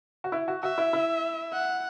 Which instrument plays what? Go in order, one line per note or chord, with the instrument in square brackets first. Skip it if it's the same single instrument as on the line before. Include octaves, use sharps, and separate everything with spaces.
[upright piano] F#4
E4
F#4
[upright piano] F#4 [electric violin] E5
[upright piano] E4
E4
[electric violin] F#5